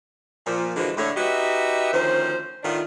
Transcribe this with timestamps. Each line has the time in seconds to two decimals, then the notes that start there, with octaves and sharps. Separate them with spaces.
0.46 A#2 F3
0.76 D3 E3 F3 G#3 A#3 F#4
0.98 A2 D3 C#5
1.16 D#4 F#4 G4 B4 D#5 E5
1.92 D2 D#3 F3 C#4 C5
2.63 A2 D#3 B3 D4 F4